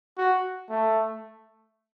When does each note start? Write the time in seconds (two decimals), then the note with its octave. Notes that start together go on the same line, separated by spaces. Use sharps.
0.17 F#4
0.69 A3